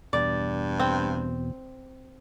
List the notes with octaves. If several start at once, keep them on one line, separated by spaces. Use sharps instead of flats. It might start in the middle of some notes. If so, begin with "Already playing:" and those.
E2 G2 B2 D5
C4